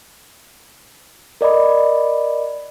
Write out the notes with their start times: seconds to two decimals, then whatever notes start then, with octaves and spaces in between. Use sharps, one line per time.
1.41 A#4 D5 D#5 B5